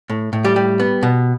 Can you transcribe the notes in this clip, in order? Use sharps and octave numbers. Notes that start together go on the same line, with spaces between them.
A2
A2
G3 G4
G3
B3
B2